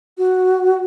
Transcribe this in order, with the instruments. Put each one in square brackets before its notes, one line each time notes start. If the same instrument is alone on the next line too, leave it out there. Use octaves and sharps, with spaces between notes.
[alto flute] F#4